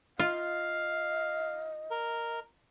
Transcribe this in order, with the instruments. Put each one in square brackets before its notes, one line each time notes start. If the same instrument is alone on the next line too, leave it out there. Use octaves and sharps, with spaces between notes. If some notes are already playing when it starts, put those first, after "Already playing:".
[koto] F4 [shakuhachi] D#5 [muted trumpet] F5
[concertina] A#4